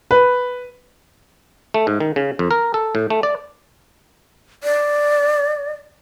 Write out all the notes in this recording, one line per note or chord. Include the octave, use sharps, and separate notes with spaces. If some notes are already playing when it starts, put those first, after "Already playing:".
B4
A3
G#2
D#3
C#3
F2
A#4
A4
A2
A3
D5
D5